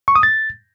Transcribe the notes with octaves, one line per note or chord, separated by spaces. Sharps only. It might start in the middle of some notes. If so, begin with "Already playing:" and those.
C#6
D#6
A6